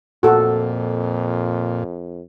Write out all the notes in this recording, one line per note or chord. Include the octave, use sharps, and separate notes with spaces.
F2 A#2 F#4 A4